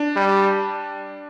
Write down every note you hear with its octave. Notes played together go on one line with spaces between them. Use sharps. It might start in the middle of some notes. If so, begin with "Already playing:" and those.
Already playing: D4
G3